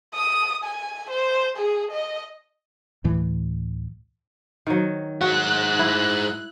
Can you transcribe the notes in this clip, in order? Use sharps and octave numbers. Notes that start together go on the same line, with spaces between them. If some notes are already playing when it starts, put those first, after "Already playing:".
D#6
G#5
C5
G#4
D#5
D2 A2 E3
D#3 F#3
G#2 F#4 F#5 F#6
E4